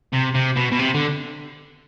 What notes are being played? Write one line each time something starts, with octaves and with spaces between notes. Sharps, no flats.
C3
C3
B2
B2
C3
D3